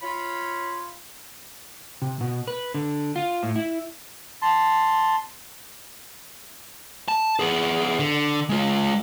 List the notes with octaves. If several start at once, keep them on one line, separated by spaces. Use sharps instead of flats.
F4 C#5 B5
C3
B2
B4
D3
F4
A2
E4
A5 C6
A5
B3 G#4
D3
G#3 F4